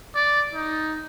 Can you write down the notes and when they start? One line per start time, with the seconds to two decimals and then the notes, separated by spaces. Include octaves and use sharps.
0.15 D5
0.53 D#4